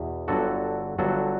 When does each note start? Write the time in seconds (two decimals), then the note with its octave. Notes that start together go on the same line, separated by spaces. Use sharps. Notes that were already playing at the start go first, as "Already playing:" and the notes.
Already playing: E2 B2
0.28 G1 G2 D3 F#3 F#4 A4
0.98 G1 G2 D3 F#3 F#4 A4